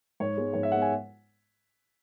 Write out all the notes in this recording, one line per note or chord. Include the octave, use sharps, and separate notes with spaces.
G#2 C#5
G#3 B3
G#2 C#5
E5
G#3 B3 F#5
G#5